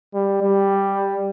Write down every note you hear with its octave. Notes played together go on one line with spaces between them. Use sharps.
G3
G3